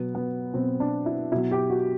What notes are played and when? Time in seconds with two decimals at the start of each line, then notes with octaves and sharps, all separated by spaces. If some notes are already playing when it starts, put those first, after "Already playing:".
Already playing: B2 F#3 B3
0.15 B3
0.54 B2 F#3 C4
0.80 D4
1.06 E4
1.32 B2 F#3 E4
1.51 G4
1.70 F#4